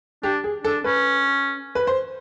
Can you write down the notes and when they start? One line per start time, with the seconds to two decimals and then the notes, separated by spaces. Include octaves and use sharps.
0.23 D4 G4
0.44 G#4
0.64 D4 A4
0.84 C#4 B4
1.75 B4
1.87 C5